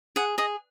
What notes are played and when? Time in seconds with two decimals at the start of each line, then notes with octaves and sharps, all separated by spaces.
0.16 G#4 F#5
0.38 G#4 D#5